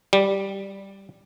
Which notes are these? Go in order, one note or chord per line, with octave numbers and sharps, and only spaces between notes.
G3